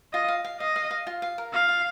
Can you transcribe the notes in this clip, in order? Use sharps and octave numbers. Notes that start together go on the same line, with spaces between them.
F4 D#5
F5
F5
D#5 F5
F5
F5
F4
F5
A#4
F4 F5
F4